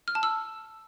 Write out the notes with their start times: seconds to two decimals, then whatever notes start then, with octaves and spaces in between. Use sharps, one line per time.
0.08 F6
0.15 A5
0.23 E6